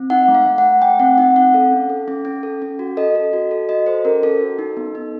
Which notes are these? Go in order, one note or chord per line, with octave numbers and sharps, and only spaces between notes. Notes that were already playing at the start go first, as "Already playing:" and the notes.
Already playing: C4
D#4 F#5
A3
F5
A3
F#5
A3
A3 G5
C4 F#5
D#4 F#5
C4 F#5
A4 F5
C#4
A4
C#4
C#4
A4
C#4
F#4
A4 D#5
A4
F#4
A4
F#4 D#5
A4 C5
C#4 A#4
C#4 A4
F#4
D#4
B3
D#4